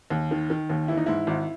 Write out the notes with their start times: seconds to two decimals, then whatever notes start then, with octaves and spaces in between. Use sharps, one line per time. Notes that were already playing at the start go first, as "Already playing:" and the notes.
0.10 D#2
0.31 D#3
0.50 D#3
0.70 D#2
0.88 E3 E4
0.97 D#4
1.06 G#2 E4
1.27 G#1